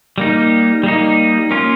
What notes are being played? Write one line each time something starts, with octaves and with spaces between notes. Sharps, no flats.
G3 A#3 D#4
G3 A#3 D#4
A#3 C#4 F4